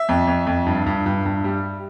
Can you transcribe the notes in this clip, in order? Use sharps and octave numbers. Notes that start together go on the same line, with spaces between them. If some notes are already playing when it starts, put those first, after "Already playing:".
Already playing: E5
F2
F2
F2
G2
G2
G2
G2
G3